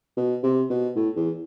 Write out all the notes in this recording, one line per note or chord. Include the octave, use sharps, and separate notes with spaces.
B2
C3
B2
A2
E2